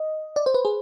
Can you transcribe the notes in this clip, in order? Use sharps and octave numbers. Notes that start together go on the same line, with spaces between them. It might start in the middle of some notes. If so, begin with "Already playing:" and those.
Already playing: D#5
D5
C5
B4
G#4